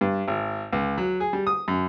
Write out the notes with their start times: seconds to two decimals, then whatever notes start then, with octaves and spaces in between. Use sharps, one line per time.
0.01 G2
0.28 G#1
0.73 C#2
0.98 F#3
1.20 G#4
1.33 G3
1.47 D#6
1.68 F#2